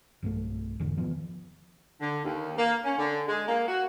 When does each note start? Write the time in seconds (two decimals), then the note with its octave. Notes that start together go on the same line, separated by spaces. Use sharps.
0.23 B1 G2 F3 A3
0.80 E2 G#2 D3
0.97 C3 D#3 F3 B3
2.01 D3
2.25 D#2
2.57 A#3
2.84 C#4
2.98 D3
3.28 G#3
3.48 A#3
3.68 F#4